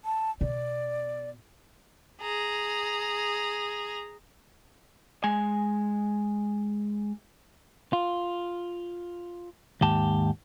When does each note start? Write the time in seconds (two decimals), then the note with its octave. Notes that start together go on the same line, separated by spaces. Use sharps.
0.05 A5
0.41 B2 D5
2.21 G#4 A#5
5.24 G#3 G#5
7.93 F4
9.81 D#2 G#2 G4 A5